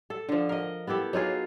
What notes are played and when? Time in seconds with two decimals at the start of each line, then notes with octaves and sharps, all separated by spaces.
0.10 A4
0.29 D3 F3
0.49 A#4 D#5
0.87 B3 E4 G4 A4
1.13 F#3 D#4 F4 G#4